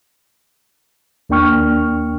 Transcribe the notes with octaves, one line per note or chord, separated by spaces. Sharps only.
D#2 A#3 D4 G5 C#6 F6